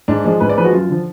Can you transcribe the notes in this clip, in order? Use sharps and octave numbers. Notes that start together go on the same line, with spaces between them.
G#2 D4
F3 G#3
G#2 B4
D5
F3 G#3 B4
F#4
F#2 F4
D3 F3